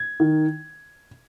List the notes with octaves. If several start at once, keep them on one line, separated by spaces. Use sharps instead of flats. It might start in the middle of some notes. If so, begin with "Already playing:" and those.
Already playing: G#6
D#3